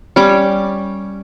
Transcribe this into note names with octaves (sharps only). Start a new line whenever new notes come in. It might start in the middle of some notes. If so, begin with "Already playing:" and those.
G3 C#4 D6